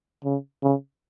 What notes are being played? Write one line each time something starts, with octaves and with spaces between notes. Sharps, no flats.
C#3
C#3